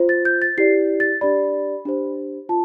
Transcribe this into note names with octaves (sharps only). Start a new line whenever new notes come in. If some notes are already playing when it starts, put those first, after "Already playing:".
Already playing: F4 C5
A6
G6
A6
E4 G4 D5 C7
A6
D4 G4 D5 B5
D4 G4 C5
F4 A5